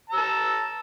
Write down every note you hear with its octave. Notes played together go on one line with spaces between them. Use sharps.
A5 A#5 E6